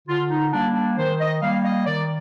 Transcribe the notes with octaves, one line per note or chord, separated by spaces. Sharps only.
D3 F4
D#4
G3 A#3 D4
D4
D#3 C5
D#5
G3 A#3 F5
D#5
D#3 D5